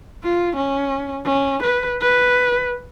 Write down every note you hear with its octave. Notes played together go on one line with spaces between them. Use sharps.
F4
C#4
C#4
B4
B4